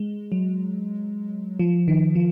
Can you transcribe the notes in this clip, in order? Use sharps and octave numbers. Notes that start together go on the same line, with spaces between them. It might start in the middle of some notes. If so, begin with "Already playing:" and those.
Already playing: G#3
F#3
F3
D#3
F3